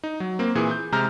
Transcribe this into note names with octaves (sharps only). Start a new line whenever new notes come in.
D#4
F#3
A#3 C4
A#2 E3 G#4
G6
C3 G#3 A#5 F6 G6